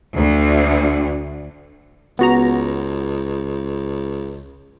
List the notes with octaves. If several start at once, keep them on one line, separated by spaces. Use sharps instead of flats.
D2
C#2 B3 F#4 A#5